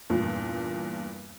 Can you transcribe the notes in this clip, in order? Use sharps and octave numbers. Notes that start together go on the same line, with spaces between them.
E2 G2 A#2